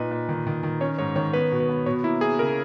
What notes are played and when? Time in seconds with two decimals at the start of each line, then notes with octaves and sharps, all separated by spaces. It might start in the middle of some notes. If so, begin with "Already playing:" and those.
Already playing: A#2 D#4 B4
0.11 A#2
0.29 D#3
0.47 D#3
0.63 D#3
0.81 C#4 C#5
0.99 G#2 C#5
1.16 D#3 C#5
1.33 B3 B4
1.52 B2
1.60 B4
1.69 B3
1.86 B2 C#5
2.03 A#3 E4
2.21 A#3 G#4
2.39 C#3 A#4